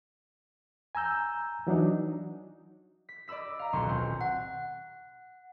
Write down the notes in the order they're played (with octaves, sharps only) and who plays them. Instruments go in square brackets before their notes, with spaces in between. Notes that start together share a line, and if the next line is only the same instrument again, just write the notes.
[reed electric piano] G#5 A#5 E6 G6
E3 F#3 D4 D#4
[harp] B6
D5 D#5 B5 E6 B6
F5 A#5
D#1 B1 F#3 C6 C#6
B1 C4
[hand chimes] F#5